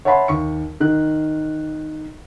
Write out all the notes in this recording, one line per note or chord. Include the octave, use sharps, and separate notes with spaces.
C#5 E5 F#5 A5 B5 C6
D#2 C#6 C#7
D#3 F#6